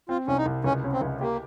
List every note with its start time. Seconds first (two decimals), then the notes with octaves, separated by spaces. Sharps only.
0.09 C4 F4
0.27 C2 C#4
0.38 D#4
0.46 C2
0.64 C#2 C#4
0.84 C#4
0.93 C4
1.02 C#2
1.21 A#3 G4